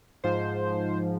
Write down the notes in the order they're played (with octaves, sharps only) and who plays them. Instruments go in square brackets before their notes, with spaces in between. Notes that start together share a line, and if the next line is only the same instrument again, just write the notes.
[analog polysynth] G#2 F3 C5